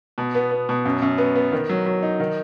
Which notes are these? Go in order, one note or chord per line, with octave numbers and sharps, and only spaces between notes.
B2
B3
B3
B2
F#2
F#2
B3
B3
D#3
F#3
F#3
D#4
D#3